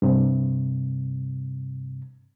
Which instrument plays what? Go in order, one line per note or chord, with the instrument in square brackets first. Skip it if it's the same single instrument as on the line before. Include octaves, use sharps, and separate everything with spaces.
[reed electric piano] G2 C3